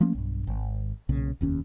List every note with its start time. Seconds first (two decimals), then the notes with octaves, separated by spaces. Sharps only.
0.01 F3 A3 A#3 C#4
0.15 B1 G2
0.47 G#1
1.09 B1 A#2 C#3
1.41 F1 D#2 C#4